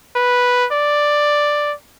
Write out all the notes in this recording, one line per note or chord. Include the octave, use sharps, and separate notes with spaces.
B4
D5